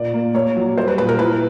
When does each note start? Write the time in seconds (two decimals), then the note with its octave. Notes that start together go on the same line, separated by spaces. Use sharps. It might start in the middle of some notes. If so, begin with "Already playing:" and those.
Already playing: A#2 D5
0.13 A#3
0.35 A#3 C#5
0.56 F#3
0.78 G3 C5
0.88 B4
0.98 A#2 B4
1.09 A#4
1.19 E4 B4